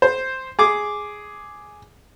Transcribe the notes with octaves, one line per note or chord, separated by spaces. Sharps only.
C5
G#4 D6